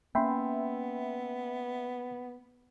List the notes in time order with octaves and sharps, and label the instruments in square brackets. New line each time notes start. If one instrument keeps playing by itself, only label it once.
[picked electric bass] A#3 C#4 [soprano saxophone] B3 [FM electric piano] E5 [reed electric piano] G5 B5 C6